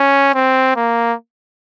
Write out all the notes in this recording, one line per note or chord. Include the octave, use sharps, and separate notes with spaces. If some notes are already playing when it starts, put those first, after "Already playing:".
Already playing: C#4
C4
A#3